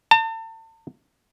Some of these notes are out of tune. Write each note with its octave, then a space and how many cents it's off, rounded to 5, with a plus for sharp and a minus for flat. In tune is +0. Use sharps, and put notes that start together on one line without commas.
A5 +40